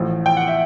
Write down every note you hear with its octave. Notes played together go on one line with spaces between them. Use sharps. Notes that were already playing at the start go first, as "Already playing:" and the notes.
Already playing: A1 A2 F3
G5
F#5
E5